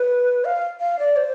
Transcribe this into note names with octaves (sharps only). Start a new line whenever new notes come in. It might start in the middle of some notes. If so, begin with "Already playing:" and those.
Already playing: B4
F5
F5
D5
C5